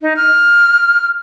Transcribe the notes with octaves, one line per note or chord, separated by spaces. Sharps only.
D#4
F6